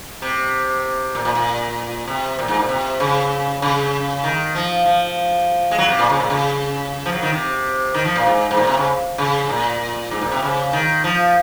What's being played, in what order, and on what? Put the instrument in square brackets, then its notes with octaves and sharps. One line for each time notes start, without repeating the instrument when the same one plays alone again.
[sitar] C3
A#2
A#2
A#2
C3
A#2
G#2
A#2
C3
C#3
C#3
D#3
F3
F3
G#3
F#3
C3
A#2
C#3
A#2
C#3
F3
F#3
D#3
C3
D#3
F3
A#2
G#2
G#2
A#2
C3
C#3
C#3
A#2
G#2
A#2
C3
C#3
D#3
F3